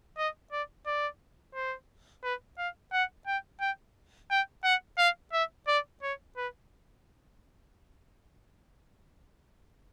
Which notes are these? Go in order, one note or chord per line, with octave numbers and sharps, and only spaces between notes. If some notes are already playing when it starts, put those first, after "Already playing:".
D#5
D5
D5
C5
B4
F5
F#5
G5
G5
G5
F#5
F5
E5
D5
C#5
B4